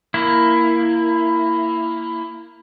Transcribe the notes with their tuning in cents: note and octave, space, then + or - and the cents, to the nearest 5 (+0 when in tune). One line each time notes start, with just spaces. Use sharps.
A#3 +0 E4 +10